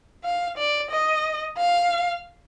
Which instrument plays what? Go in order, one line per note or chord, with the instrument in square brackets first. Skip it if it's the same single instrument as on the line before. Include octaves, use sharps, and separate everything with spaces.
[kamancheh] F5
D5
D#5
F5